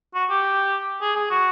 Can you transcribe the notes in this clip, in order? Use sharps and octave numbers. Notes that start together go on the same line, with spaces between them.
F#4
G4
G#4
G#4
F#4